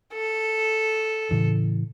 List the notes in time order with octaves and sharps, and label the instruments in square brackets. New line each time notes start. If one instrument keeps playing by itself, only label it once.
[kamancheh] A4
[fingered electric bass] A2 C#3 E3